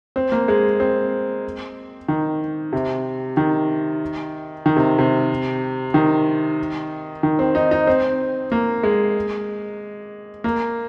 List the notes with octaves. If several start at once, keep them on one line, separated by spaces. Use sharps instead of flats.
C4
A#3
G#3
C4
D#3
C3
D#3
D#3
C3
C3
D#3
D#3
C4
D#4
D#4
C4
A#3
G#3
A#3